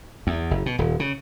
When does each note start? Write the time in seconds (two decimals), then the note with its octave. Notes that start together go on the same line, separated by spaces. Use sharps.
0.27 E2
0.51 F#1
0.66 B2
0.79 D#1
1.00 C#3